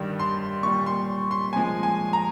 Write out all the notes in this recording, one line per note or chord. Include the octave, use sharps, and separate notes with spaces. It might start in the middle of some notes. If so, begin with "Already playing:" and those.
Already playing: G2 D#3 G3
C6
A#2 G3 C#6
C6
C6
A#2 F3 G#3 G#5
G#5
A#5